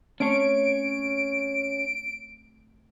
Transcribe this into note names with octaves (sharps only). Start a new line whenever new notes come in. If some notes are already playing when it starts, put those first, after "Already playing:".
A3 C4 C#4 C#5 D7